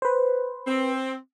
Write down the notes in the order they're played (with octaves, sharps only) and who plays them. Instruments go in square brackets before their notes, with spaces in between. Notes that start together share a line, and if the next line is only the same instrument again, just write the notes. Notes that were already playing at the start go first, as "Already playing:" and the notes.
[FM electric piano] B4 C5
[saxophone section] C4